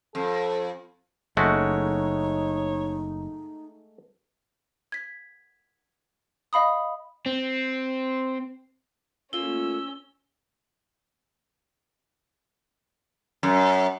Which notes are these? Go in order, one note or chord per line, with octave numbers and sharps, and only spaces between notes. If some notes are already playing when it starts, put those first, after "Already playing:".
F2 A4
F#1 G#3 A3 D#4 F#4 C#5
G#6 B6
D#5 F5 B5 D#6
C4
A3 A#3 C#4 F4 E6 G7
F#2